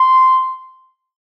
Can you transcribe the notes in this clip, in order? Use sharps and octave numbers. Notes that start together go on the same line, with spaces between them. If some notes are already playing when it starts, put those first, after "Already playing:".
Already playing: C6